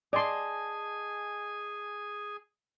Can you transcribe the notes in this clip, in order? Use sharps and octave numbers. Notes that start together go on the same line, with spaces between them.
G#4 D5 D#5 G#5 A5 C6